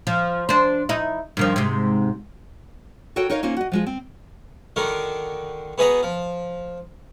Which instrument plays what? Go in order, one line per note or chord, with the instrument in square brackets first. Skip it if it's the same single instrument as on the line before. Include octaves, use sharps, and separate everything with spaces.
[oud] F3
D4 C5
D#4 E4
G2 D#3 F3
G#2 C3
[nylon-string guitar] F#4 A4 A#4 C#5 G5
D#4 A#4 C#5 D#5 F5
A#3 C#4 D#4 F4 C5
F#4 D#5
F3 G#3 F4
C4
[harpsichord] D3 D#3 F#4 A#4
B2 G#4 B4 D#5 F#5 A#5
F3